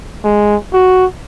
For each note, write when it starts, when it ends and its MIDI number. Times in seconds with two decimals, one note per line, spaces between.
0.24 0.56 56
0.73 1.05 66